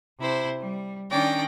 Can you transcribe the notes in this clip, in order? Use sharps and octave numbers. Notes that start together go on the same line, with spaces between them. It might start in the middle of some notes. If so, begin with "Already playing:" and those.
C3 E4 C5
G3
D#3 C#4 D4 D5 G5 A#6